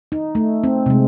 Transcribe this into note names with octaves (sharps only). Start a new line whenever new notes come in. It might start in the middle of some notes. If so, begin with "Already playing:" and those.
D#4
A3
C4
C3 G#3